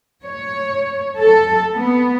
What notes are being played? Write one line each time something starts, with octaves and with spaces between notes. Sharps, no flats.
C#5
A4
B3